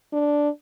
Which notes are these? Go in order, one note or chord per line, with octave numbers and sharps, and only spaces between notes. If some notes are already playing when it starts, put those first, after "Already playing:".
D4